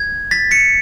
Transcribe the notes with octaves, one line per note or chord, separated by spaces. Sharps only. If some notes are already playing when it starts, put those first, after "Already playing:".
Already playing: G#6
A6 B6
B6 C#7